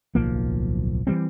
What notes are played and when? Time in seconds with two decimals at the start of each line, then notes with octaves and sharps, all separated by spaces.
0.15 D1 B1 F3 A#3
1.07 E3 F3 G3 C4